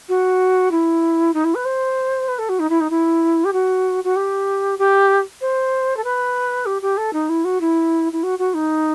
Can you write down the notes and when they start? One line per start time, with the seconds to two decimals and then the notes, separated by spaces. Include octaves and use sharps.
0.08 F#4
0.71 E4
1.33 D#4
1.44 E4
1.54 B4
1.65 C5
2.28 B4
2.38 A4
2.49 F#4
2.59 D#4
2.69 E4
2.80 D#4
2.90 E4
3.44 G4
3.53 F#4
4.04 F#4
4.16 G4
4.78 G4
5.41 C5
5.96 A4
6.04 B4
6.66 G4
6.82 G4
6.97 A4
7.13 D#4
7.29 E4
7.44 F#4
7.60 E4
8.12 E4
8.23 F#4
8.38 F#4
8.54 D#4